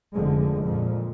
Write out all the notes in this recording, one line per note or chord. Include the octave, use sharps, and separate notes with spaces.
F1 D3 F3 G#3
F2 A#2 F3